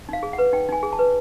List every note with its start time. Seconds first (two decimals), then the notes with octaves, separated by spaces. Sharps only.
0.09 D#4 F5
0.23 G#4
0.33 F#5
0.38 B4
0.53 D#4 G5
0.69 D#4 G#5
0.83 G#4
0.93 A5
0.99 B4